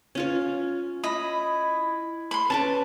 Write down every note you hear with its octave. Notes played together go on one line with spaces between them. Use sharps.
C#4 F4 C#5
E4 D#5 B5
B5 C6
C#4 B4 A5 C#6 D6